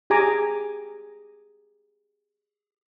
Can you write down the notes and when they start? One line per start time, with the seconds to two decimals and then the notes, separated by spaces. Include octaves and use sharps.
0.10 G4 G#4 G#5 A#5 D6